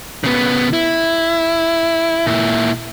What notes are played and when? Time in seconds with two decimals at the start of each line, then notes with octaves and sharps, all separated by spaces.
0.24 C#3 B3
0.73 E4
2.27 A#2 E4